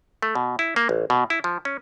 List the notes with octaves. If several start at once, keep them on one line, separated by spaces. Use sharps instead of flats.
A3
B2
E4
A#3
A1
B2
E4
F3
C#4